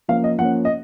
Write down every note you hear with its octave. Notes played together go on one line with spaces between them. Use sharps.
F3 A#3 C#4 F5
D#5
F3 A#3 C#4 F#5
D#5